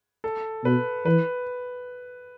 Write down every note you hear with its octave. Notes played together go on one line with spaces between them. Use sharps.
A4
B2 B4
E3 B4